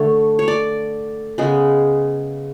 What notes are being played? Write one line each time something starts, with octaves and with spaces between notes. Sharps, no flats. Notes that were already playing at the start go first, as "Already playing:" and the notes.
Already playing: D3 A3 C#5
C#5
D5
C#3 G#3 B3